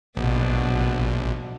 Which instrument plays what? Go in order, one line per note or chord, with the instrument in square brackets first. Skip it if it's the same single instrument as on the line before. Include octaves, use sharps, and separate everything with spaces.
[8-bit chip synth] A#1 [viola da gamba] B2 F#3 D4